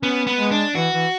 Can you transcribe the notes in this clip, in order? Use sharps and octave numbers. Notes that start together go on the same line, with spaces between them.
B3 C#4
B3
G#3
D4
E3 F#4
E3